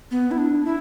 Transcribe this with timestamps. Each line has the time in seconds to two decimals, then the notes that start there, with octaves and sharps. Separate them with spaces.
0.11 B3
0.31 E4
0.38 D4
0.65 E4